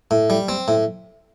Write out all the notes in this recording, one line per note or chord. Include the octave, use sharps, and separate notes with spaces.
A2
G3
C4
A2